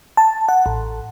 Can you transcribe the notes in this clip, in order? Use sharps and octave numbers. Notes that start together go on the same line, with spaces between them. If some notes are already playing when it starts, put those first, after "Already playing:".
A5
F#5
A1